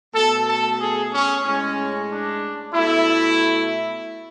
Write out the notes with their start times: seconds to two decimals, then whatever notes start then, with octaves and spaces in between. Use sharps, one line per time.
0.14 B2 A3 A4
0.47 A4
0.79 G#4
1.12 C#4
1.44 A2 G#3 C#4
2.10 D4
2.74 B2 A3 E4